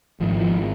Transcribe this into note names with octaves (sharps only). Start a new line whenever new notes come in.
G#1 G#2 F3
F3